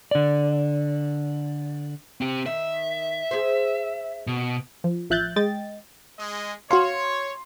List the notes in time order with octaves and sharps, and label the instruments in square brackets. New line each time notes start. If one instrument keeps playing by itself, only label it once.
[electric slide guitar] D3 D5
[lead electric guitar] C4 G4
[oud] D#3 [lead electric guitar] E5
[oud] G#4 C5
[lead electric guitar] B2
[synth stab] F3
A1 F3 E5 F#6 G6 A6
G#3 D#5 G5 A6
[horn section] G#3 D#5
[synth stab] F#4 F5 [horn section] C#5 [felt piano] C6